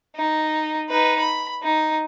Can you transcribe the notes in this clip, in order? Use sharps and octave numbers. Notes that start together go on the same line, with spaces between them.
D#4
D#4 B4
B5
D#4